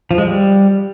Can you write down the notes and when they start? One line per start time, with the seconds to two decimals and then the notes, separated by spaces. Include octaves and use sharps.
0.11 F3
0.18 G#3
0.25 G3